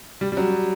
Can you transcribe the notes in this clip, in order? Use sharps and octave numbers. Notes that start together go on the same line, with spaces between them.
G3
G3
F#3